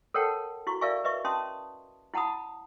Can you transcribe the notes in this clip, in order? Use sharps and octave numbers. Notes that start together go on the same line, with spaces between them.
A4 A#4 C#5 F#5 G5 A5
E4 F#4 C#6
A#4 D5 E5 F5 G#5 C#6
B4 D#5 E5 C#6
C#4 A5 C6 D#6
E4 F#5 A5 B5 D#6